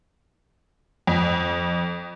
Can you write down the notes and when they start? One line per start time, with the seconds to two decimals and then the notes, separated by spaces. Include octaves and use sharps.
1.07 F2